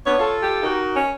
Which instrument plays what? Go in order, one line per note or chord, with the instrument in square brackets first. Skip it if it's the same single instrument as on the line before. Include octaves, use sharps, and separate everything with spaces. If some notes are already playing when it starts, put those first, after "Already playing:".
[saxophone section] B3 C#4 D4 [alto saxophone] C#5
[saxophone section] F4 A4
[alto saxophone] G4
[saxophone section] D#4 F#4 A#4
[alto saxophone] C#4